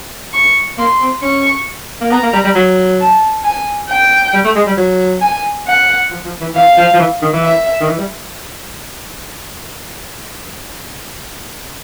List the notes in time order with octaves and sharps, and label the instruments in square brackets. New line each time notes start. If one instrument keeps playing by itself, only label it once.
[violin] C#6
[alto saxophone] A#3 [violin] C6
[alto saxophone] C4
[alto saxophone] C#4 [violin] C#6
[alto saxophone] A#3
[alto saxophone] B3 [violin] A#5
[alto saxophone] A#3
G3
G3
F#3
[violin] A5
G#5
G5
[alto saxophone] G3
A3
G#3
G3
F#3
[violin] G#5
F#5
[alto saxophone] F3
F3
E3
[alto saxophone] E3 [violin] F5
[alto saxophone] F3
F3
E3
D#3
E3
[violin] E5
[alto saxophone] D#3
E3
G3